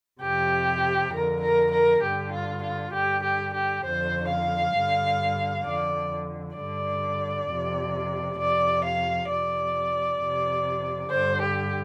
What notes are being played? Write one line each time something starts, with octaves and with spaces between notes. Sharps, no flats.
F2 C3 G4
F2 D3 A#4
A#4
A#4
G2 D3 G4
F4
F4
G2 D3 G4
G4
G4
F2 D3 C5
F5
G2 D3
F2 D3 D5
G2 D3 D5
F2 C3
F2 C3 D5
F5
F2 C3 D5
F2 C3
G2 D3 C5
G4